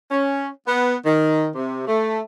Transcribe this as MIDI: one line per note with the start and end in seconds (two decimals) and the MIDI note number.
0.11 0.49 61
0.67 0.95 59
1.06 1.49 51
1.55 1.83 48
1.87 2.19 57